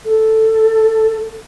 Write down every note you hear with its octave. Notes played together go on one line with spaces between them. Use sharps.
A4